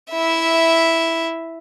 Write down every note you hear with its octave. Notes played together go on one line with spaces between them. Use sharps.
E4 E5